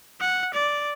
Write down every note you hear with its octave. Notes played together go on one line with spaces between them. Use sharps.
F#5
D5